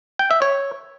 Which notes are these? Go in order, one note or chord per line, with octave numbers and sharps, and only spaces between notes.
G5
E5
C#5